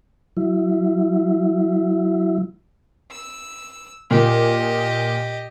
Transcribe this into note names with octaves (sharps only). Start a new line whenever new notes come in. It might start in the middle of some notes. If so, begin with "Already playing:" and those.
F#3 E4
E6
A#2 G4 D#5